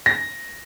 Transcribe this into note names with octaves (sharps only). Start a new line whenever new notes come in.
A#6